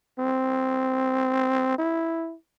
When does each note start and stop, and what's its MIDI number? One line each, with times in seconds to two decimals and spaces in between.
0.19 1.74 60
1.78 2.34 64